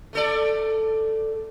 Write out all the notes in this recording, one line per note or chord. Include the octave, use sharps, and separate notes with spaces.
A3 A4 D5